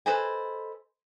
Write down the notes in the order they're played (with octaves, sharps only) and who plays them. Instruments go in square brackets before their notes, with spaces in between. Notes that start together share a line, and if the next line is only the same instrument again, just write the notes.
[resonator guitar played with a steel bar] A4 B4 C5 D#5 G#5